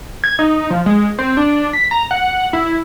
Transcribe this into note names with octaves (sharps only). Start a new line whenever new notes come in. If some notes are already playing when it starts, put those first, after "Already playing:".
G#6
D#4
F3
G#3
C4
D4
B6
A#5
F#5
E4